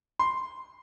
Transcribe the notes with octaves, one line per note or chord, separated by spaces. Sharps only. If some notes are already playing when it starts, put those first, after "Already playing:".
C6